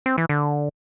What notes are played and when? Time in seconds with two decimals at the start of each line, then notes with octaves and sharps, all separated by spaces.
0.06 C4
0.18 E3
0.29 D3